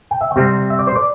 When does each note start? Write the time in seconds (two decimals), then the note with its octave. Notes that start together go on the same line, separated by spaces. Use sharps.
0.11 G5
0.21 E5
0.31 G5
0.36 C3 G3 C4
0.70 E5
0.79 D5
0.87 C5
0.96 D5